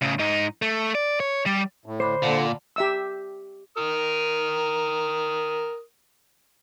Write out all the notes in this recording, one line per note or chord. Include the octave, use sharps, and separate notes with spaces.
A2 C#3
G#2 D#4
A3
D5
C#5
G3
A2
D3 C5 B5 D6
A#2 D3 D5 F#5 A5
G4 E5 E6
A#4 D#6